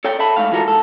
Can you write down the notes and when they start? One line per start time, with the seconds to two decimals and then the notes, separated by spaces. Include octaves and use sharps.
0.05 A4 C#5 D5 G5
0.19 A4 E5 A5 B5
0.36 G#2 A3 F5
0.52 E3 G#3 F4 F#4 A4 A#4
0.64 G#2 A4